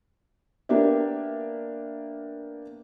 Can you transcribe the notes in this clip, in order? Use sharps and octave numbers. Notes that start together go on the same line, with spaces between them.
A#3 B3 D4 G4 E5